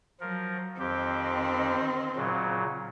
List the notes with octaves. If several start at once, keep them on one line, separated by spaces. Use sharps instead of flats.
F3 F#3 A#4
F2 D#3 C4 G4
A#2 C#3 F#3